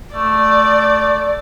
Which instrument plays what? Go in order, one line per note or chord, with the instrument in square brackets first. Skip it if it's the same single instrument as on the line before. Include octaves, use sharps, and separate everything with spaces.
[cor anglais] A3 [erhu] D5